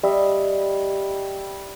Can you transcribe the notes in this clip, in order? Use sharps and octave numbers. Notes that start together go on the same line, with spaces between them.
G3 D#5 E5